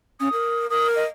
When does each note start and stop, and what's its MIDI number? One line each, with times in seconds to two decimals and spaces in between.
0.20 0.28 61
0.20 0.67 87
0.33 0.67 70
0.70 1.02 70
0.70 0.87 87
0.96 1.07 75